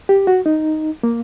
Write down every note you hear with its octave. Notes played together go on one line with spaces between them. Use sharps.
G4
F#4
D#4
A#3